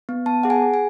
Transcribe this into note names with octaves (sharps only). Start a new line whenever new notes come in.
B3
B3 A5
G#4 F#5
G#5
G#4
G#5